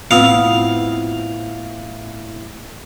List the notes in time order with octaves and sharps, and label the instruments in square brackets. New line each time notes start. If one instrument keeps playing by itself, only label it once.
[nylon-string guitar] A2 B3 C4 [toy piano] F4 D#6 E6 [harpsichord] F5